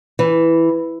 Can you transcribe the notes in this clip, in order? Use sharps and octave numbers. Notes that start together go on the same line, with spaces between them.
E3